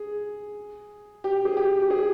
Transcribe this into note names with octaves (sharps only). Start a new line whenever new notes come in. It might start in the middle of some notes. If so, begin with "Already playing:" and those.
Already playing: G#4
G4
G#4
G4
G4
G#4